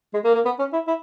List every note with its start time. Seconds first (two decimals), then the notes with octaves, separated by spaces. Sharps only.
0.13 G#3
0.24 A#3
0.34 A#3
0.45 B3
0.59 C#4
0.73 E4
0.87 E4